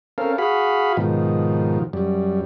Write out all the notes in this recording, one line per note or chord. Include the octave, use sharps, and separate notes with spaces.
C4 C#4 A4 A#4 F5
F#4 G#4 F5 B5
G#2 B2 D#3 F3
F#2 G3